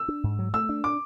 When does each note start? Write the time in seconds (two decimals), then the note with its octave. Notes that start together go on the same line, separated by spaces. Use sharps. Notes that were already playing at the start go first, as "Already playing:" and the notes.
Already playing: E6
0.08 D4
0.24 G#2
0.39 F#3
0.53 A3 E6
0.69 D4
0.84 D6